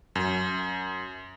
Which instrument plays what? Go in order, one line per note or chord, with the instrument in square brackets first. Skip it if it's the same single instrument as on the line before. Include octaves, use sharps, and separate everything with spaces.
[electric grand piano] F#2